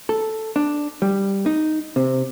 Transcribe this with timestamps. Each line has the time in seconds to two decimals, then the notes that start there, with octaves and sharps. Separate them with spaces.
0.09 A4
0.56 D4
1.02 G3
1.46 D#4
1.96 C3